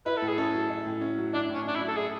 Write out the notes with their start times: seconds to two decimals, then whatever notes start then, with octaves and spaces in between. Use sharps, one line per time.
0.06 E4 B4
0.17 A4
0.22 A2
0.28 G#4
0.38 C#4 A4
0.54 F#3
0.70 E4
0.86 A2
1.01 C#4
1.18 F#3
1.33 D4 E4
1.49 A2
1.54 C#4
1.65 C#4 D4
1.75 E4
1.81 F#3
1.88 A4
1.96 E4 G#4